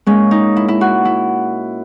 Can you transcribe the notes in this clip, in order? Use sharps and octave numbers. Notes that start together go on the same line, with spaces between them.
A#2 G#3 C#4
D#4
E4
E4
F#4
E4